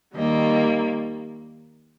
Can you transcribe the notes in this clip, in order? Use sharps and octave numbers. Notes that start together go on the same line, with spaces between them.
D#2 D#3 G3 A#3 D#5